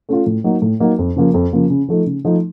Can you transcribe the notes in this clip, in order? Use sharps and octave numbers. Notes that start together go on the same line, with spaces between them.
A3 C#4 F4
A2
F#3 A#3 D#4
A2
F#3 A#3 D#4
F2
C#3 F3 A#3
F2
C#3 F3 A#3
C#3
F3 A3 D#4
C#3
F3 A3 D#4